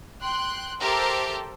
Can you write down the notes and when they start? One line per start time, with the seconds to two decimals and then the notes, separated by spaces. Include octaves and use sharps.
0.21 G5 C6 F#6
0.81 G4 A4 A#4 C5 E5 G5